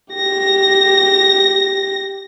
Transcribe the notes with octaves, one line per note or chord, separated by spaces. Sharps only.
G4 A#6